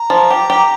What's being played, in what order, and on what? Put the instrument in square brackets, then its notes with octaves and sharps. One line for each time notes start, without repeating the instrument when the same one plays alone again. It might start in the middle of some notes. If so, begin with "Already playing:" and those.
Already playing: [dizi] A#5
[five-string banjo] F3
G4
G4